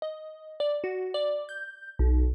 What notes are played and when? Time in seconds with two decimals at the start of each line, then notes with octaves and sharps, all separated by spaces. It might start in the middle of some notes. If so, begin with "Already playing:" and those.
0.02 D#5
0.60 D5
0.84 F#4
1.14 D5
1.49 G6
1.99 B1